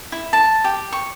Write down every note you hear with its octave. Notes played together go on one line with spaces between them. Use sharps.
E4
A5
G4
C#6